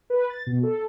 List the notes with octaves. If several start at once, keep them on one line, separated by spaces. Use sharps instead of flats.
B4
A6
B2
A4